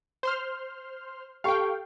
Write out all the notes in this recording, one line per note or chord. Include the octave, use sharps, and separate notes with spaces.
C5 C6 F6
G4 A4 F5 G5 C#6